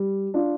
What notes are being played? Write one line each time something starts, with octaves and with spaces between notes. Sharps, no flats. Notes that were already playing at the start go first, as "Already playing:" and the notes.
Already playing: G3
D4 F4